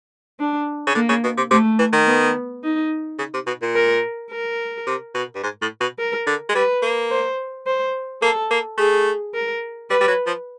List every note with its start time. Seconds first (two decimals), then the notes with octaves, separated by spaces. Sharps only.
0.40 D4
0.87 C#3
0.95 D3 A#3
1.09 C#3
1.24 B2
1.37 C3
1.51 C3 A3
1.79 E3
1.93 D#3
2.08 B3
2.64 D#4
3.19 C#3
3.34 C3
3.47 B2
3.62 A#2
3.75 A#4
4.31 A#4
4.87 C3
5.15 B2
5.35 G2
5.43 G#2
5.62 A2
5.81 B2
5.99 A#4
6.27 D3
6.49 G#3
6.55 G3 B4
6.82 A#3
7.10 C5
7.67 C5
8.22 A#3 A4
8.51 A#3
8.78 A3 G#4
9.34 A#4
9.90 G3 B4
10.01 G3
10.08 F#3
10.27 F3